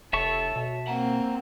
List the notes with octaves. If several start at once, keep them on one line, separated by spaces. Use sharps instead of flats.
F1 A4 C#5 E5 A5 C#6
B2
A#3 C4 F#5 A#5